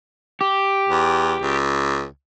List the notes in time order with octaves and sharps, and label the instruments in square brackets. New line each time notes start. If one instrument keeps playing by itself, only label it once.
[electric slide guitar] G4
[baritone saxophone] E2
C#2